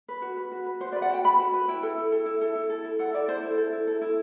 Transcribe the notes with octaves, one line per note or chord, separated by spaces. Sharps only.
B4
F#4
B4
F#4
B4
F#4 C5
D5
B4
F#5
F#4 G5
B4 B5
F#4
B4
E4 G5
A4
E4
A4
E4
A4
E4
A4
E4
A4 F#5
E4 D5
A4 C5
E4
A4
E4
A4
E4